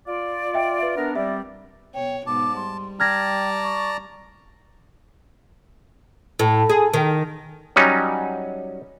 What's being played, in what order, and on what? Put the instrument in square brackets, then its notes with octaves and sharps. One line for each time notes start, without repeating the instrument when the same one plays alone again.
[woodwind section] F4 D5
[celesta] D#5 E5 G5
B4 E5
[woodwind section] B3 D4 A#4
[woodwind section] G3 C4 D5 [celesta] E5
[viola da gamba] B2 C#5 [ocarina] G5
[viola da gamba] G#2 B2 [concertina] A5 [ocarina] D6
[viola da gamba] G3 [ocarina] C6
[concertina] D5 A5 A#5 [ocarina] G5 [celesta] F6 G#6 A#6
[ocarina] C#6
[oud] A2
G#4
D#3
[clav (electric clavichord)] F#3 G3 C#4 D#4